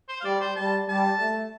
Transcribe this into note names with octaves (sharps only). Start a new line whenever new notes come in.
C5
F5
G3 D5
C5
G3 A5
G3 A5
A3